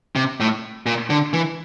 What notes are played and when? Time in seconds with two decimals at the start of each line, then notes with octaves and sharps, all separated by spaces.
0.16 C3
0.40 A2
0.86 A#2
1.10 D3
1.33 E3